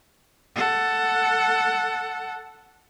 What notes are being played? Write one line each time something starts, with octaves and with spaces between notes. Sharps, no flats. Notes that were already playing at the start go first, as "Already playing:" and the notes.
A4 F#5